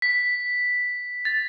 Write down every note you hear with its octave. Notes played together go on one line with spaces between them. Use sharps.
B6
A6